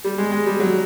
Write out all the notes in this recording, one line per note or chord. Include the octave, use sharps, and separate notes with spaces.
G3
G#3
G#3
G3
F#3